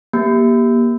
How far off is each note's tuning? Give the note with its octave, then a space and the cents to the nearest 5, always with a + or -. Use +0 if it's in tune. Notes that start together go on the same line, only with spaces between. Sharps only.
A#3 +30 G4 +0